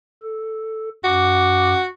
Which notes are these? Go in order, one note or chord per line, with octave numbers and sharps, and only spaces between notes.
A4
F#2 F#4 D6